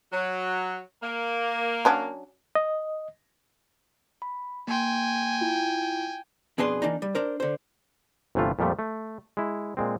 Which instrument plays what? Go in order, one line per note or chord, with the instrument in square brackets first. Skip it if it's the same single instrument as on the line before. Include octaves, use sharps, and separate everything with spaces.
[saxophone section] F#3
A#3
[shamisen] F#3 C#4 D4
[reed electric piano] D#5
[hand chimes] B5
[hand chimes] A#3 C6 [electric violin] G5 G#5
[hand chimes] E4 F4
[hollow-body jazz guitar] F2 B2 D4 G#4 B4 C6
E3 A#3 D4 D#4
G3
D4 A#4 C5
D3 C5
[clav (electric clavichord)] G1 C3 E3 A3 F4
F2 A#2 F3 G3 A3
A3
G#3 E4
A#2 G#3 C4